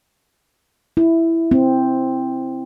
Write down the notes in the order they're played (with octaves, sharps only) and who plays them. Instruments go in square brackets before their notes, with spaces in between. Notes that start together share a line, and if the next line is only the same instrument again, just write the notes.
[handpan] E4
C4